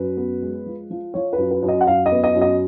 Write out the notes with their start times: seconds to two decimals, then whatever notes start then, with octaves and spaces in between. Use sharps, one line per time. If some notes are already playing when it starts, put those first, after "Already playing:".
Already playing: F#2 B4
0.17 B3
0.42 G#3
0.66 F3
0.90 F3
1.14 F3 C#5
1.33 B4
1.38 F#2
1.51 B4
1.63 F#2
1.68 D#5
1.81 F#5
1.87 F#2 F5
2.06 D#5
2.12 B3
2.24 D#5
2.35 F#2
2.41 D#5